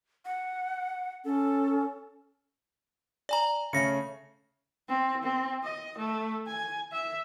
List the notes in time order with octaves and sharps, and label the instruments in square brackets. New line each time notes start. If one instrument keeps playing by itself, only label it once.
[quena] F#5
[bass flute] C#4 [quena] A4
[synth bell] D5 G#5 A#5
[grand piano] C#3 A3 C#4 [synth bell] A#6 C#7
[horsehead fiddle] C4
C4
D#5
A3
G#5
E5